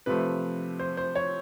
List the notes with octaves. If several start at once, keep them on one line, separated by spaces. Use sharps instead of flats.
C3 F3 A3 B4
C5
C5
C#5